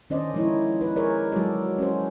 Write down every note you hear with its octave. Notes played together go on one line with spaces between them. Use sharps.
D#3 C#4 D4 C5 D5 D#5
F3 G#3 C#4 D#4 E4 C#5
D#4 B4
G#4 A#4 C#5 D5
F#3 G#3 F#4 A4 D5
C#4 F#4 C5